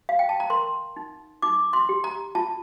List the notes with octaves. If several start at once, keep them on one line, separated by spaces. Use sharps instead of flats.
F5
G5
A5
A#5
A#4 C6
D#4
D#4 D6
C6
G4
A#5
F4 A5